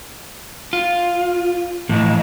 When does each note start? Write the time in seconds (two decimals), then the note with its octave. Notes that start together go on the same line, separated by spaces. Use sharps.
0.73 F4
1.89 A2 E3 F3 D#5